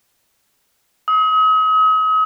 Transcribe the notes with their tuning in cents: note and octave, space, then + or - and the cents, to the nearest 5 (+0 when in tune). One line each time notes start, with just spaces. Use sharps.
D#6 +40